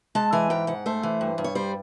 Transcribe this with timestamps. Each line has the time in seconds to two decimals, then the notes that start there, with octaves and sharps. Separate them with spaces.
0.15 G#3 A5
0.32 E3 G#5
0.50 G#2 G5
0.67 G#2 F#5
0.86 A3 C5
1.03 E3
1.21 G2
1.38 G2
1.44 C#5
1.55 G3 C5